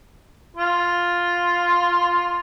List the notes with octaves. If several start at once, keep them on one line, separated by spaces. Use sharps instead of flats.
F4 C6